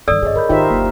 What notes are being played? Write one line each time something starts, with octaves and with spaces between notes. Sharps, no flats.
G2 D#3 A4 D5 E6
G1 A#2 G#4 C#5 D#5
D3 A#4 B5 G6
G#1 D#3 D#4 F4 G4 C5 E5 G5
F#1 D#2 A#3